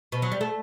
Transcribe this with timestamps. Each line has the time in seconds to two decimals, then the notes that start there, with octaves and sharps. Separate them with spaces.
0.12 B2
0.22 F#3
0.32 G3
0.41 A3